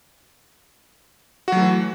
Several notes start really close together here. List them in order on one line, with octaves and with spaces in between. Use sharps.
F#4 F#3 A3 E3